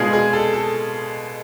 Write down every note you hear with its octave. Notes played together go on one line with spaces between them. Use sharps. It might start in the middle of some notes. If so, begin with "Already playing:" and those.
Already playing: B2 G#3 D4 F4 G#4
G#4
A4
A4